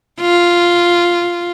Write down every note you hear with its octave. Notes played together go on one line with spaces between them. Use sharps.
F4